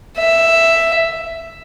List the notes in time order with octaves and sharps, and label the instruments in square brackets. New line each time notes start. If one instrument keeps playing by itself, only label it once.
[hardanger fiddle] E5